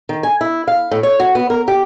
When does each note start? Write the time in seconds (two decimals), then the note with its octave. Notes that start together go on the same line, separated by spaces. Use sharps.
0.09 D#3
0.23 G#5
0.41 E4
0.68 F5
0.91 A2
1.03 C#5
1.20 F#4
1.35 B3
1.50 A#4
1.68 G4